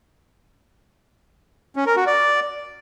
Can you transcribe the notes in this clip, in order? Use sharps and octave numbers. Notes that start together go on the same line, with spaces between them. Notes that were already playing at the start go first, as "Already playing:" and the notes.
C#4
A#4
F#4
D5